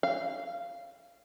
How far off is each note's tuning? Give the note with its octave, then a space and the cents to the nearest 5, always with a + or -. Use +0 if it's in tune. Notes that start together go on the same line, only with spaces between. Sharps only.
F5 -15